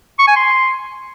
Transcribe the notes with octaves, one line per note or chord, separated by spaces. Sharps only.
C#6
G#5
C6